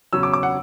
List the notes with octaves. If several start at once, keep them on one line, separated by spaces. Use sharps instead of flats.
E2 C#3 F#3 C#4 E6
D6
D6
F#5